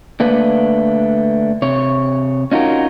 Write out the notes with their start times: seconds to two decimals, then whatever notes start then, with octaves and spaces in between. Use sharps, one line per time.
0.20 D3 A3 A#3 B4
1.62 C3 C#5
2.52 C#4 D#4 F4 F#4 A#4